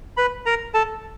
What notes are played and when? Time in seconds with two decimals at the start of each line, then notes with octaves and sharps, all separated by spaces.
0.17 B4 B5
0.46 A#4 A#5
0.74 A4 A5